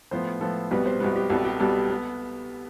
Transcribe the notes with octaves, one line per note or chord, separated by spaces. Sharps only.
A2 F3 B3 C5
A2 F3 B3 A4
C2 B2 G3 B3 B4
C5
C2 B2 G3 B3
G4
C2 B2 G3 B3 A4
G4
C2 B2 G3 B3 A4
B3